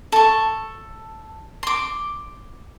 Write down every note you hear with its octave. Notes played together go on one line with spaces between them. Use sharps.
A4 C#6
C6 D6